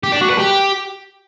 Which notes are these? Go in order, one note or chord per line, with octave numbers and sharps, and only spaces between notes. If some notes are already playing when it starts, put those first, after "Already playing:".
G4
D4
F#4
B4
G4